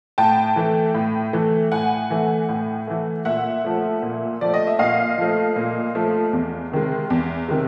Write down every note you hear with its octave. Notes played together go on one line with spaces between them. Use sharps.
A2 G5 A5
E3 A3
A2
E3 A3
A2 F#5 G#5
E3 A3
A2
E3 A3
A#2 E5 F#5
F3 A3
A#2
F3 A3 D5
D#5
E5
A#2 D#5 F5
F3 A3
A#2
F3 A3
E2
C3 D#3 G#3
E2
C3 D#3 G#3